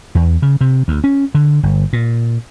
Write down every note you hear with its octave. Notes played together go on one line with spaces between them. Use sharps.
E2
C#3
C3
D2
C#4
D3
G1
A#2